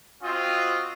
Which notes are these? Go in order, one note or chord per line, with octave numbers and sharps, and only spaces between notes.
C4 F4 F#4 D#5 D#6